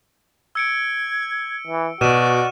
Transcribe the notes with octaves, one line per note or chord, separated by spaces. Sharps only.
E6 G#6 C#7 D7
E3
B2 F#4 D5 F6 D#7 E7